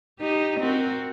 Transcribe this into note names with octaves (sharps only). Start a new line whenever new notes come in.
D#4 G4
C4 F#4 A#4